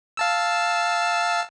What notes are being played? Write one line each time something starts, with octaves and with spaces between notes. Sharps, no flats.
F5 A5 E6